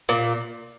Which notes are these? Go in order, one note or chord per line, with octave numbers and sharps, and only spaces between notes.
A#2